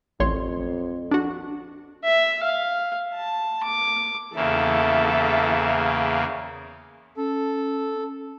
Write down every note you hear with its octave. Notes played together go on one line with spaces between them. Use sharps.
A1 F2 C#5 C6
D4 F#4
E5
F5
A5
D6
E2 C#3 A#3 A4 E5
C#4 A4